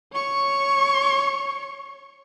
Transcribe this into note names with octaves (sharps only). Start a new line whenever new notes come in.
C#5 C#6